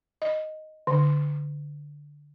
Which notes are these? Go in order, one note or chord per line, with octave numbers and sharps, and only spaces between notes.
D#5
D3